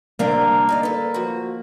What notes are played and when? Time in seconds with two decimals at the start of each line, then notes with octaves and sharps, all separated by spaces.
0.19 C3 A#3 C4 D4
0.69 D#4 D5 F5
0.83 A4 B4
1.14 F3 F#4